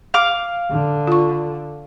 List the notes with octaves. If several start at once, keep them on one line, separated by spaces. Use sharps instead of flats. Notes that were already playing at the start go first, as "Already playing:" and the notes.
F5 D6
D3
F4 C#6